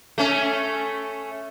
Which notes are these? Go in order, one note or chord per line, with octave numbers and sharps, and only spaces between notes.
A3 C#4